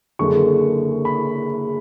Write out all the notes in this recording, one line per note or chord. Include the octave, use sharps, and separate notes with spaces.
F#1 F#2 D3 G#3 C#6
B5